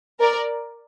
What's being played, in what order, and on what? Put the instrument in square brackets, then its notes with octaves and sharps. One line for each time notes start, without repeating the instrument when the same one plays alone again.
[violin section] A#4 D5